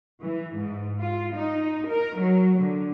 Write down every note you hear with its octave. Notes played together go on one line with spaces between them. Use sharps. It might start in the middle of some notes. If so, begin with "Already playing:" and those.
E3
G#2
F4
D#4
A#4
F#3
D3